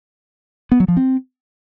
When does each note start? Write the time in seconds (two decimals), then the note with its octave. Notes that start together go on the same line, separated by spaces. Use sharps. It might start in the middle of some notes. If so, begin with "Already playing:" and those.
0.72 B3
0.80 F#3
0.88 F3
0.97 C4